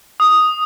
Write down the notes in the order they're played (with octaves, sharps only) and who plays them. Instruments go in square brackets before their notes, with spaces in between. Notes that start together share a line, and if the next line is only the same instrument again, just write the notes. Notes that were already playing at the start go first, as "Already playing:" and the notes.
[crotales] D#6